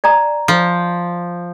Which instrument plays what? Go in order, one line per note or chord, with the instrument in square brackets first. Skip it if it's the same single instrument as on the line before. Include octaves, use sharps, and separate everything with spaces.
[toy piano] D5 G#5 A#5
[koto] F3